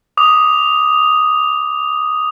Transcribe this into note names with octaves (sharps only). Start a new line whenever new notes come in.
D6 D#6 F7